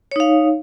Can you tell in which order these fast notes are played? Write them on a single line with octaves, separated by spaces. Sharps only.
C#5 D#4 F5